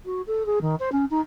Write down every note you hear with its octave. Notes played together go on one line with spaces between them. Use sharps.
F#4
A4
G#4
D#3
C5
C#4
D#4